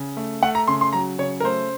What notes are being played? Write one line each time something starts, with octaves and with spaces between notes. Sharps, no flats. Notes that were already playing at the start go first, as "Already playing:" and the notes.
Already playing: C#3
A3
A3 F#5
A#5
C#3 C6
C6
F#3 A#5
C#3 C#5
A#4
A3 C5